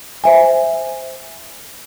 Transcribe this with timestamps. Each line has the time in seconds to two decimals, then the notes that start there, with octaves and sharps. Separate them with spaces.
0.24 C5 E5 G#5